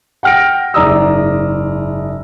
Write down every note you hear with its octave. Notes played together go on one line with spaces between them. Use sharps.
F#5 G5 F6 A#6 D7
F#1 G#2 D5 A#5 D#6 E6